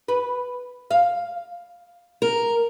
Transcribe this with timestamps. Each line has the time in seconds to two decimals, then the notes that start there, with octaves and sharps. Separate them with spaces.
0.08 B4
0.91 F5
2.22 A#4